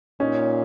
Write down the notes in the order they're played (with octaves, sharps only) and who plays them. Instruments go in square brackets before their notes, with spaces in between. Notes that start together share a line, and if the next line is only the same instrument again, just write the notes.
[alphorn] A#2 [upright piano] C#4 D#4